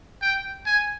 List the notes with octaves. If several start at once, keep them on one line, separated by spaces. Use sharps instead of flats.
G5
G#5